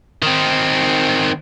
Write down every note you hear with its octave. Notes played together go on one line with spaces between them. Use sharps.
D#3 C4